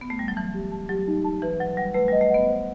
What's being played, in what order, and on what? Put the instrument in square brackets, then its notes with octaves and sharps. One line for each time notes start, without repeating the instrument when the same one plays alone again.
[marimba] B3
A3
G3
F#3
[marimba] E3 [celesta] A5
[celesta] G4
A5
[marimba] F#3 [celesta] G4
[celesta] D#4
A5
[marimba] E3 [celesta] B4
[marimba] F#3 [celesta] F#5
[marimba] G3 [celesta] F#5
[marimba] A3 [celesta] B4
[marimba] G3
[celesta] D#5
[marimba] A3
[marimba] B3 [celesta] F#5
[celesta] C5